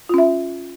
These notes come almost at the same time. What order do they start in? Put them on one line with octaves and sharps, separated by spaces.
F4 C#4 E5